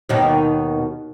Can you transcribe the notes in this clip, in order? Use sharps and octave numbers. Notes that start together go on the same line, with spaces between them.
D#2 B2 D#3